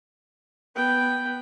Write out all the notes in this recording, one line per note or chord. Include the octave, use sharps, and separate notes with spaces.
B3 G5